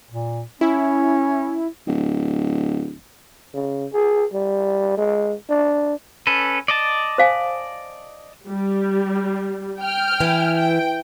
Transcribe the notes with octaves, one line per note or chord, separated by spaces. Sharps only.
A#2
C#4 E4
D1
C#3
G#4
G3
G#3
D4
C#4 A4 B4
D5 D#5 A5
C5 F5 G#5
G3
G5 F6
E3
G5